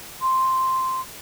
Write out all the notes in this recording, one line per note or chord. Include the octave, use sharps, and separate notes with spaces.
C6